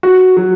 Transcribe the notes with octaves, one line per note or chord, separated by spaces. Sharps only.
F#4
F#3